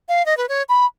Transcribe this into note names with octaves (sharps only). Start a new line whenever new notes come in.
F5
D#5
B4
C#5
B5